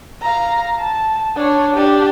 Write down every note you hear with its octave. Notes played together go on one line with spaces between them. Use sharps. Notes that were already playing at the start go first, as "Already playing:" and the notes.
F5 A#5
A5
D4 C#5
D4 G4